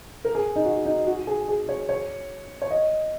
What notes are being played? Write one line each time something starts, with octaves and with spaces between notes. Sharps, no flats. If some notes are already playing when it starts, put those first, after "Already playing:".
A#4
G#4
D#4
F#4
D#4
F#4
G#4
G#4
C#5
C#5
C#5
D#5